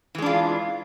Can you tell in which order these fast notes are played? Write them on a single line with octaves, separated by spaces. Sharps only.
E3 G#3 D4 F4